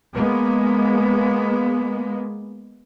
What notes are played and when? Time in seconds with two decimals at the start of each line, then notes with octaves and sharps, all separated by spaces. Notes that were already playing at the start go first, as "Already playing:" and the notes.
0.13 G#3 A#3 B3